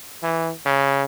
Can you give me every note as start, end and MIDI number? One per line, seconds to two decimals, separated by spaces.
0.23 0.52 52
0.65 1.04 49